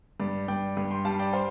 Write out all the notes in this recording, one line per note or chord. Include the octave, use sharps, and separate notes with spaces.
G2 D5
G2 D5 G5
G2
G5 C6
G3 F5 A5
D5 G5
C5 F5